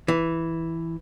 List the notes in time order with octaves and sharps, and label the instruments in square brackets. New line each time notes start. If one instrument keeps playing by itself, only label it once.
[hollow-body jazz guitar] E3